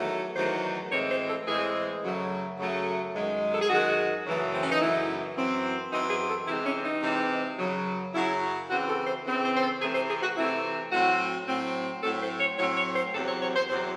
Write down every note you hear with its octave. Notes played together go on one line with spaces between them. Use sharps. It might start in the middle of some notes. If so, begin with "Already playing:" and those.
Already playing: E2 D#3 F#3 A3
E2 D#3 F#3 A3 C5
A2 E3 G#3 C4 C#5
C5
A4
A2 E3 G#3 C4 G#4
F#2 C#3 F#3 A3
F#2 C#3 F#3 A3
F#2 D#3 G#3
A4
G#4
F#2 D#3 G#3 F#4
F#2 C#3 E3 A3
C4
C#4
D#4
F#2 C#3 E3 A3 E4
F#2 E3 C4
F#2 E3 C4 D#4
G#4
A4
C3 E3 G#3 C4 E4
C#4
D#4
C3 E3 G#3 C4
F#2 C#3 F#3
F#2 C#3 F#3 E4
C#3 E3 C4 F#4
A4
C5
C#3 E3 C4
C5
C5
A4
C3 E3 A3 C4 G#4
C5
G#4
F#4
C3 E3 A3 C4 E4
A2 F#3 C4 F#4
A2 F#3 C4
A2 F#3 C4 A4
C5
C#5
A2 F#3 C4 C#5
C#5
C5
E2 C3 F#3 C4 A4
C#5
C#5
C5
E2 C3 F#3 C4 C5